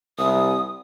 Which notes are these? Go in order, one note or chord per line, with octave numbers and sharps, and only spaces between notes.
C2 D#6